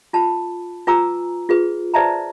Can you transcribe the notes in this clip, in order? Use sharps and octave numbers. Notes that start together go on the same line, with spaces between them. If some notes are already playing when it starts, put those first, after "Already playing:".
F4 A5 B5
F4 B4 G#5 A#5 D6 E6
F4 G#4 B4
B4 C5 D5 E5 A5 A#5